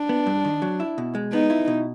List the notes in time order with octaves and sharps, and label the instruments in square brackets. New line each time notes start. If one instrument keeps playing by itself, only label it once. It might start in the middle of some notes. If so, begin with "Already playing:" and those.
Already playing: [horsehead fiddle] D4
[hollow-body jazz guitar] B3
G2
D#3
F#3
E4
B2
G#3
[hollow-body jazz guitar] B3 [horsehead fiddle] D#4
[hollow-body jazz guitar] E4
B2